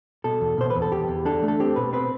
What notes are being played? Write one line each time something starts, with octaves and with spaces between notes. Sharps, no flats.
B2 A4
E2
B2 C5
B4
E2
A4
E2 G4
E2
D4 A4
A3
A4
C4 G4
B2 B4
C4 B4